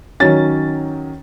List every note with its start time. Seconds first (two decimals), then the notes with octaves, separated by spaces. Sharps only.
0.20 D#3 F#3 C#4 A6